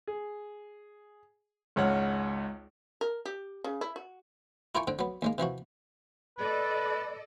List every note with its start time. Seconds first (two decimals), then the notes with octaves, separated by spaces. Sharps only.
0.07 G#4
1.76 G#1 C#2 C#5 F#5 F6
3.01 A#4
3.25 G4
3.64 C#3
3.81 E4
3.96 F#4
4.75 E4 F4 A#4 G5 G#5 C#6
4.87 D3 C4 G5
4.99 F#3 B3
5.22 D#2 G#3 A#3
5.38 C3 E3 F3 F#4
6.38 A4 B4 D5 D#5